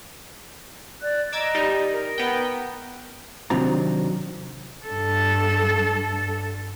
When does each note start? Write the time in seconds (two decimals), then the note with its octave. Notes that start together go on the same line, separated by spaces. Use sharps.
1.02 D5 F#6
1.33 D#5 A#5 D6 E6 G#6
1.55 G3 D#4
1.92 A#4
2.18 B3 G5
3.50 C3 D#3 F#3 C4 D4 A#5
4.86 G2 A4